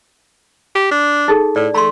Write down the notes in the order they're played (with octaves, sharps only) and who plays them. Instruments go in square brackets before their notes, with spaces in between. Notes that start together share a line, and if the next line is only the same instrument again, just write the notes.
[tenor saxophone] G4
D4
[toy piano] D#4 G#4 A4
[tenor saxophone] A2 [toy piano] D5
[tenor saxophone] A3 [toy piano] A#5 C6